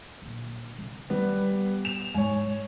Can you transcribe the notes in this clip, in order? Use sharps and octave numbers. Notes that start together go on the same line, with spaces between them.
A#2 D3
C3 C4
G3 B3
E7 F7
G#2 C3 C#5 G#5